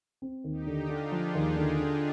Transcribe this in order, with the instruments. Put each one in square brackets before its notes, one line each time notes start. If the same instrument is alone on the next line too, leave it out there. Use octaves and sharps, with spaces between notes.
[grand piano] C4
D#2
[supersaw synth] D#4 G4
[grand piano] D3
[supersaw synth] D4 F4
[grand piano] D3
[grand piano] F3 [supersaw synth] F4 G#4
[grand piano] D#2
D3
D3